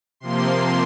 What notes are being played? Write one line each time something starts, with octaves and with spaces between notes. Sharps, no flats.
C3 F3 A#3 C6
C6